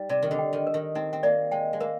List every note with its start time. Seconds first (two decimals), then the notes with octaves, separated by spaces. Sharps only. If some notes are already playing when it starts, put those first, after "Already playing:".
Already playing: G3 D#4
0.09 C3 D5
0.22 D#3
0.31 D3
0.38 G5
0.53 D#3
0.67 A#4
0.74 D#3
0.95 C4 D#4
1.13 C4
1.23 A#3 D5
1.52 G#3 G5
1.73 G#3
1.80 A#3 A#4